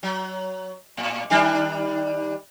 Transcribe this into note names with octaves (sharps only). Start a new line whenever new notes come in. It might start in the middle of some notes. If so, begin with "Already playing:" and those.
F#3
A2
D#3 G3 D4